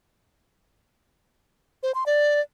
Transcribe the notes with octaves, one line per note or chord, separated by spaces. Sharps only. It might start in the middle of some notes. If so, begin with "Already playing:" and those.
C5
C6
D5